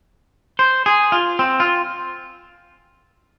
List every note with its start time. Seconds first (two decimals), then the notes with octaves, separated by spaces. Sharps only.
0.59 C5
0.86 G#4
1.12 F4
1.39 C4
1.60 F4